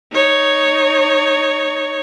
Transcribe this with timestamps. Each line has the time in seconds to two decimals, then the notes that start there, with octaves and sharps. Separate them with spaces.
0.12 D#4 C#5